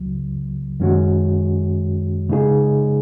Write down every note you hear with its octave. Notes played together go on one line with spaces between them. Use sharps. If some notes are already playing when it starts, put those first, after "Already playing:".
Already playing: C#2 C#3 F#3
F#2 D#3 G#3 C#4 F#4
C#3 G#3 D#4 G#4